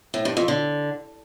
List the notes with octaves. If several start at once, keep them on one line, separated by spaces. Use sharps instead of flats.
A2
G2
F2
D3